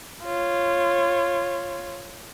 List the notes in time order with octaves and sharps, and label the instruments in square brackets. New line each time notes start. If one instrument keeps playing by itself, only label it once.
[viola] F4 C#5